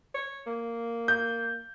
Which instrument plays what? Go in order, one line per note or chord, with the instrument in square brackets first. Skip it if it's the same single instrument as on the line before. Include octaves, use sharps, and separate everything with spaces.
[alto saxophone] C#5
A#3
[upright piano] G6